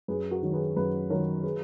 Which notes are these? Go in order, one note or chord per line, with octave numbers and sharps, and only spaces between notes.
F#2 G#4 B4
F#4 A#4
D#3 F#3
G#4 B4
F#2 G#4 B4
D#3 F#3 A#4 C#5
G#4 B4